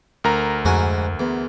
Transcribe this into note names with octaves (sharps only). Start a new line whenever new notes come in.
D2 A#4 A#5
F2 G#2 F#4 G#5
E2